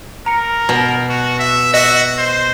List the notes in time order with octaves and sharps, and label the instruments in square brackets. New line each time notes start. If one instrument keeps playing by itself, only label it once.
[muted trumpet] A#4 [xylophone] A#5 C#7
[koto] B2
[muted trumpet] F#4
E5
[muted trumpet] F#4 [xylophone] D#5 E6
[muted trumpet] C5